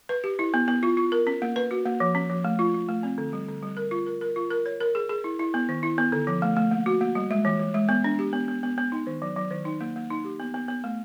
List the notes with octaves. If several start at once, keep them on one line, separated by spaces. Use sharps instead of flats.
B4
G4
E4
B3
B3
F4
F4
A#4
C#4
A#3
B4
F#4
A#3
F3
C#4
F3
A3
F4
F4
A3
C4
D3
G3
D3
G3
A#4
F4
A#4
A#4
F4
A#4
C#5
A#4
G#4
G#4
E4
E4
B3
D#3
E4
B3
D3
F3
A3
A3
A#3
F#4
A#3
G3
G#3
E3
E3
G#3
B3
D4
G4
B3
B3
B3
B3
D#4
D#3
F#3
F#3
D#3
D#4
A#3
A#3
D#4
G4
B3
B3
B3
A3